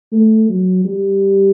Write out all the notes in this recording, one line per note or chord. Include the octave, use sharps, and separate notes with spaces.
A3
F#3
G3